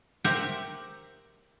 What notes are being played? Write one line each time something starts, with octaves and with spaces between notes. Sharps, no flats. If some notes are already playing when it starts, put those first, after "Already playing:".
G4 A#4 C5 E5 F#5